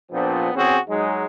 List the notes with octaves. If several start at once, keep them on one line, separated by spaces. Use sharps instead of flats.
A#1 A#2 F3 B3 C4 D4
E2 C4 C#4 F#4 G#4
F#3 G#3 D#4